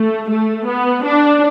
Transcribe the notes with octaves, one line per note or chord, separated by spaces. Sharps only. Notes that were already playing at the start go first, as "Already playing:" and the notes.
Already playing: A3
A3
B3
D4